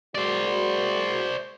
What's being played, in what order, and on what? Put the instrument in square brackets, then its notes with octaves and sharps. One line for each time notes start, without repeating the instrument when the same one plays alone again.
[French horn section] G#3 A#3 F#4 [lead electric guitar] C5 D5